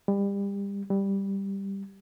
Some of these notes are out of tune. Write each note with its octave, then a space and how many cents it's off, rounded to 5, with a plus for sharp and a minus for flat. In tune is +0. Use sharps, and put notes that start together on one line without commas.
G3 +30
G3 +5